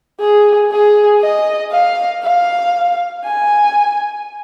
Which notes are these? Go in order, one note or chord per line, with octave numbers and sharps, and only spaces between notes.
G#4
G#4
D#5
F5
F5
G#5